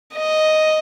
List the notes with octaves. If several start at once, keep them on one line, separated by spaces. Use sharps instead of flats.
D#5